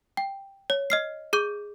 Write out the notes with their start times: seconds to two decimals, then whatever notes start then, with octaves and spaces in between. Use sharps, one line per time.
0.17 G5
0.70 C#5
0.90 D#5 F6 C7
1.33 G#4 D6 G6